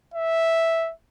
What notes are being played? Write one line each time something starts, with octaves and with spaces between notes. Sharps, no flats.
E5